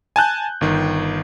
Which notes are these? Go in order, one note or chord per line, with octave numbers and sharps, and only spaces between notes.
G#5 A5 F#6 G6
G1 D#3